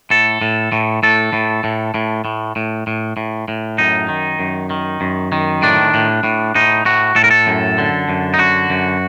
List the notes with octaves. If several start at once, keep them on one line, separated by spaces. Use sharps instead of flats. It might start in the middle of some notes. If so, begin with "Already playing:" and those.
A2 A4
A2
A2
A2 A4
A2
A2
A2
A2
A2
A2
A2
A2
F#2 D#4
D#3
F#2
D#3
F#2
D#3
A2 D4
A2
A2
A2 D#4
A2 F#4
A2 A4
A#4
A4
F#2
D3
F#2
D#4
D3 F#4
F#2